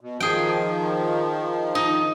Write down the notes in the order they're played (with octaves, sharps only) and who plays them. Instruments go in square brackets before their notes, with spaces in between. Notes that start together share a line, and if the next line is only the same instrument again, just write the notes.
[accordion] B2
[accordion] D#3 F3 [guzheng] G#4 G5
[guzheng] D#4